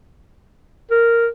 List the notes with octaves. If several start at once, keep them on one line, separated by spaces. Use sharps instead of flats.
A#4